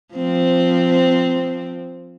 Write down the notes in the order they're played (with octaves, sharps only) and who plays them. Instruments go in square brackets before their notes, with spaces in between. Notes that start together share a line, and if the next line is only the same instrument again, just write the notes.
[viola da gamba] F3 C4